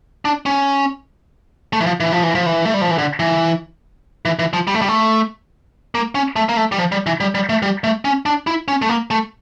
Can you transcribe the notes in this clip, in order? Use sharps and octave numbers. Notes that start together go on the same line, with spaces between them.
D4
C#4
A3
E3
F3
E3
F3
E3
F3
E3
A3
G3
F3
E3
D3
E3
E3
E3
F3
G3
A3
G3
A3
A#3
C#4
A3
A#3
A3
G3
F3
G3
E3
G3
G3
A3
G3
A3
C#4
D4
E4
C#4
A3
A#3
A3